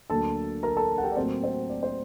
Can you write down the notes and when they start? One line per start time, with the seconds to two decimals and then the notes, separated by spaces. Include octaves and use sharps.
0.10 D2 D3 F#3 A#3 A4 A5
0.63 A#4 A#5
0.77 A4 A5
0.98 F#5
1.03 G4 G5
1.12 D5
1.16 A2 F#3 A#3 C4 C5
1.43 C4 C5
1.70 D5
1.83 C5